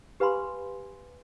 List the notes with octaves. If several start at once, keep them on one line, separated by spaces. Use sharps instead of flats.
G4 B4 F5 G#5 B5 C6